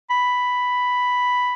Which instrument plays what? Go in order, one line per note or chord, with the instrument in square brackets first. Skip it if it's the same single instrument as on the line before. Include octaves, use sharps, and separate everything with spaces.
[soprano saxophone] B5